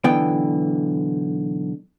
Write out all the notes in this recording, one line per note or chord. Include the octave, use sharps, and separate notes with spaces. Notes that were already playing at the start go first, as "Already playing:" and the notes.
B1 D3 E3 B3 G5